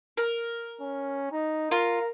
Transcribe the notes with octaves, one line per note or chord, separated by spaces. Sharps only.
A#4
C#4
D#4
F4 A#4